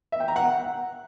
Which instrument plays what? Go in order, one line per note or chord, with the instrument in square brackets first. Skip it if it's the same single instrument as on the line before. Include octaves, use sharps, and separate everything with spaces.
[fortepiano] E5
G5
A#5
F#5